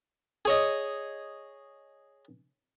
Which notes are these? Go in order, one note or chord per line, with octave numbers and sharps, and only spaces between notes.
G#4 C#5 D#5